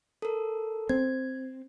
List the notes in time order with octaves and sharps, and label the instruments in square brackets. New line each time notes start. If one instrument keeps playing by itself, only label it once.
[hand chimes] A4 A#4
[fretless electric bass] C4 [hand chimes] G#6